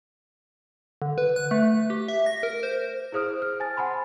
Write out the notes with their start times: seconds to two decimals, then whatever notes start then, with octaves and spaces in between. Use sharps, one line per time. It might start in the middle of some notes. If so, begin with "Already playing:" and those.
1.02 D3
1.18 B4
1.36 F#6
1.51 A3
1.90 G4
2.08 E5
2.26 A#6
2.43 A#4
2.63 C5
3.12 E4 G#4 C5 D#6 F6 D7
3.42 F6
3.60 C5 G#5 A5 A6
3.77 F#5 G#5 A5 B5 C6